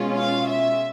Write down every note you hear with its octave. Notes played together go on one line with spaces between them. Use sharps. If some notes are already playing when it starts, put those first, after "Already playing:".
Already playing: B2 G#3 C#4 F4
F5
E5